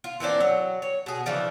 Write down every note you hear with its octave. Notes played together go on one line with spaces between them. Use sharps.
F4
E3 A#3 C4 D4
F#3
C#5
B2 G#4
C#3 E3 F3 D4